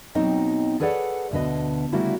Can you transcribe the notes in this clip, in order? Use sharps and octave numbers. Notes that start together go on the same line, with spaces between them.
B2 F#3 C4 D#4 D#5 G5
G#4 A4 B4 C#5 D5 F#5
D2 B2 D3 B4 D#5
C#3 G3 A3 A#3 E4 F#4